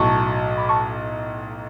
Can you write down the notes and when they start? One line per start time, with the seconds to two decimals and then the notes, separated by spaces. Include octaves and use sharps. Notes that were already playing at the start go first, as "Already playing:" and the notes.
Already playing: B1 A2 F#3 A5 C#6
0.58 B5 D6
0.69 A5 C#6